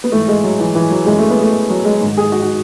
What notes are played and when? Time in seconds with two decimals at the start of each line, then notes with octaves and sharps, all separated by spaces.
0.04 B3
0.12 G#2 E3 A3
0.28 G#3
0.44 F#3
0.60 E3
0.75 E3
0.91 F#3
1.06 F#2 E3 G#3
1.19 A3
1.30 B3
1.42 A3
1.70 F#3
1.85 G#3
2.01 G#2 D#3
2.17 G#4
2.32 F#4
2.42 F#4